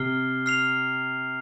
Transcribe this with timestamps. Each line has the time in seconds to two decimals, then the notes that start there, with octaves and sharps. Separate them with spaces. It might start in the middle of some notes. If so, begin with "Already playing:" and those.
Already playing: C3 F6 C7 G7
0.46 F6 C7 F7